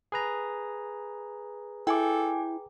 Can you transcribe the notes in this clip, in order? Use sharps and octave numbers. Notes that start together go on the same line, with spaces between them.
G#4 B4 A#5
E4 A4 G5 G#5 D6